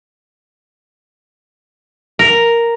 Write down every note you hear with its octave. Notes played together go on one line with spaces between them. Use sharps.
A#4